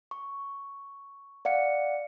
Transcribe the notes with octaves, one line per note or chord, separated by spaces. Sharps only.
C#6
D5 F5 F#5 C#7